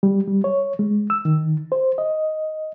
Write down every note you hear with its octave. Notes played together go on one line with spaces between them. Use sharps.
G3
G3
C#5
G#3
E6
D#3
C5
D#5